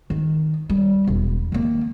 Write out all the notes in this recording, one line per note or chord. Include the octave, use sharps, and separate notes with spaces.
D#3
G3
E1
D#3 A#3